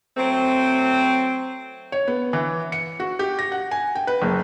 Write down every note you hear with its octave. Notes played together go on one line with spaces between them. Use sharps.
F#3 A3 C4
C#5
B3
E3
C#7
F#4
G4
A#6
F#5
G#5
G5
B4
F#1